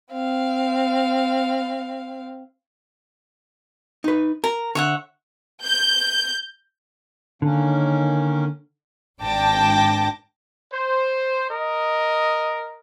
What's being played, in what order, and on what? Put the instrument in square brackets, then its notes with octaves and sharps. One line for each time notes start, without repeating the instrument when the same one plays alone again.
[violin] C4 F5
[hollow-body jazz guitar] D#4 B4
[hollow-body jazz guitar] A#4 [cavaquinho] A#5
[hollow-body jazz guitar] D3 [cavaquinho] C#5 E5 F#5
[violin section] G6
[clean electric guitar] D3 [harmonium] D#3 A#3 C#4
[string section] G#1 D4 G5 A5 D6 A#6
[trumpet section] C5
A#4 D#5